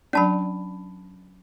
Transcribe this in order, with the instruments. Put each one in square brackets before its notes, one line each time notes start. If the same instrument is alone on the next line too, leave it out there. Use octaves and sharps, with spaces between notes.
[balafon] F#3 D4 D5 [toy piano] C#4 A5 B5